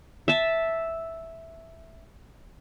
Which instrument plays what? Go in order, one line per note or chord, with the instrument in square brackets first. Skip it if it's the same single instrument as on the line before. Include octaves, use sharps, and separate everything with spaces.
[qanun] E5 A5